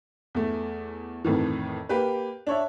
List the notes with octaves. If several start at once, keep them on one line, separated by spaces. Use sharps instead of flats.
E2 A3
F2 A2 D#3 E3
A#3 G4 B4
D4 C#5 E5